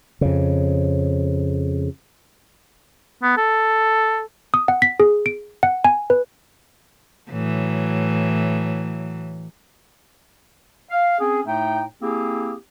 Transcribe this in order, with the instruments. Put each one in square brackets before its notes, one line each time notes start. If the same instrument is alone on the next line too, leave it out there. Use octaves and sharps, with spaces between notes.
[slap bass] F2 C#3
[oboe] B3
A4
[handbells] D#6
F#5
B6
G#4
D7
F#5
G#5
B4
[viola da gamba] A2 E3 F#3
[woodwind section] F5
C4 C#4 G#4
A2 A3 D#4 G5
A#3 C4 E4 G4 G#4